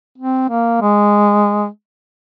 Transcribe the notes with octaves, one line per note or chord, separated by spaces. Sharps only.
C4
A#3
G#3